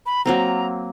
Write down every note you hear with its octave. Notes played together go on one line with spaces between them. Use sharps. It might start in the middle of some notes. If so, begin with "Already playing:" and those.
B5
F#3 A#3 C4 A#5